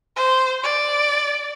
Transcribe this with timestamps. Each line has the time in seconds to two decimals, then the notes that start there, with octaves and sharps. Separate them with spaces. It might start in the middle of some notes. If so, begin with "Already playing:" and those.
0.16 C5
0.63 D5